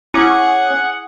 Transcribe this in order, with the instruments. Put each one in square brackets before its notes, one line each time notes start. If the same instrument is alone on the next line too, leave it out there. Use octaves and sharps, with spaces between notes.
[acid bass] C#4 [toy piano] E4 D6 [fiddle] G#4 [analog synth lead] F#5